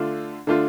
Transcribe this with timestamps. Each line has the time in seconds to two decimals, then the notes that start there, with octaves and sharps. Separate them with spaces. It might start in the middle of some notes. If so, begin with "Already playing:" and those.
Already playing: D3 A3 D4 F4
0.47 D3 A3 D4 F4